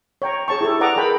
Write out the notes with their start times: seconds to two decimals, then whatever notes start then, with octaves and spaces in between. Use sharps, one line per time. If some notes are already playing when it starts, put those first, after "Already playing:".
0.22 C#5 G5 A#5
0.48 G#4 C#5 A5 C#6
0.61 E4 G4 A4
0.80 B4 D5 F#5 A#5 D6 D#6
0.96 G#4 A#4 G5 B5